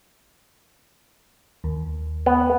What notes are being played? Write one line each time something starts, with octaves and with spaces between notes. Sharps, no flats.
D#2
B3